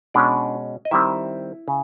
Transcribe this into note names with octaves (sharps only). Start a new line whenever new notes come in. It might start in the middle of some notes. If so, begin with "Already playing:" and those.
B2 G#3 C#4 D4 D5
D#5
D#3 G3 C4 E4 E5
C#3